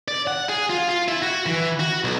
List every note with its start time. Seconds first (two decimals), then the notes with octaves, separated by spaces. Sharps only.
0.08 D5
0.27 F#5
0.49 G#4
0.70 F4
0.89 F4
1.08 E4
1.22 F#4
1.46 E3
1.80 F#4
2.04 B1